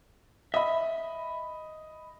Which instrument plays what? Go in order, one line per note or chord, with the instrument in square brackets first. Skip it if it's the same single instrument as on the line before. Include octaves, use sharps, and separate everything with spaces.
[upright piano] D#5 B5 [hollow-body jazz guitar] E5